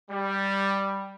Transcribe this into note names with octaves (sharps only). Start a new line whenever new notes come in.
G3